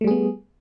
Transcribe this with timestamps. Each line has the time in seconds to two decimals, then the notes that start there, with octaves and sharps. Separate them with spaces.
0.01 A3
0.04 G3
0.07 G#4
0.11 B3